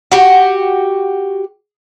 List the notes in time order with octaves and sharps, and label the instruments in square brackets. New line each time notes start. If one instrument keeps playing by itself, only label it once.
[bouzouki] F#4 G4